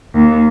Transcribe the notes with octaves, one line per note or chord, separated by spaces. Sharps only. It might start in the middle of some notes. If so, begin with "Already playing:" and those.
D#2